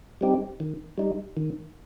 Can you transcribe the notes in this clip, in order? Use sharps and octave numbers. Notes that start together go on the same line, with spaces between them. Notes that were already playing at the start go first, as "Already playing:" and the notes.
G3 C4 D#4 G4
D#3
G3 D#4
D#3